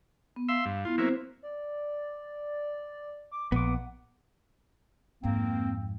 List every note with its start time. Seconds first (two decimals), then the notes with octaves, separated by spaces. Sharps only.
0.36 B3
0.49 E5 F5 C6 E6
0.66 G2
0.85 B3 E4 F4
0.98 F#3 A#3 C4 C5 E5
1.43 D5
3.32 D6
3.52 A#1 B3 F#5 D6
5.24 F2 G#2 A#3 C4